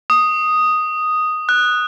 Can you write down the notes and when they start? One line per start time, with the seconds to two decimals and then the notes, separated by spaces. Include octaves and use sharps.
0.10 D#6
1.49 F#6